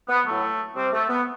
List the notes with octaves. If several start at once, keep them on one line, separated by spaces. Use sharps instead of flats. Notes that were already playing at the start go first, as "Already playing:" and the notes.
B3
A2 F#3 A3
C3 G3 C4
A3
B3